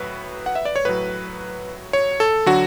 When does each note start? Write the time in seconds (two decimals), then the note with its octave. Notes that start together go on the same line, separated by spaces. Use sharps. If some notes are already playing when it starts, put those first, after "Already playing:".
Already playing: A2 F#3 B4
0.46 F#5
0.55 E5
0.65 D5
0.76 C#5
0.85 A2 F#3 B4
1.93 C#5
2.20 A4
2.46 D3 F#3 F#4